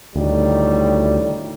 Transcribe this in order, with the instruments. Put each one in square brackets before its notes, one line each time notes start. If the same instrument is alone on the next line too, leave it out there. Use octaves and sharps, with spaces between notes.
[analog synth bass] D2 [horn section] A2 D#3 G3